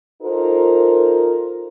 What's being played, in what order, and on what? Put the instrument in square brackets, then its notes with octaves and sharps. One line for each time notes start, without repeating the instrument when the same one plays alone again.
[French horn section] D#4 F4 A4 A#4 C5